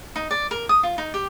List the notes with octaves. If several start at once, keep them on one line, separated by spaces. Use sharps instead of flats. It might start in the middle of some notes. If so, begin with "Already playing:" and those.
D#4
D5
A#4
D#6
F4
D#4
G4